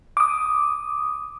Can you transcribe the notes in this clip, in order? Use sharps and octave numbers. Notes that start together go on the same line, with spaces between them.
D6 D#6